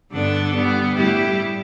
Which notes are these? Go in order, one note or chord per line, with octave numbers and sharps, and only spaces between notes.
G2 D3 B3 D4 A4
D3 G3 B3
A2 G3 E4 G4